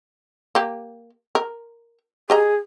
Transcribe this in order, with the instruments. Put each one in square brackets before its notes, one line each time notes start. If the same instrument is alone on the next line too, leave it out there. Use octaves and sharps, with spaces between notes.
[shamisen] A#3 G4
A#4
[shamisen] G4 D#5 A#5 [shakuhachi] G#4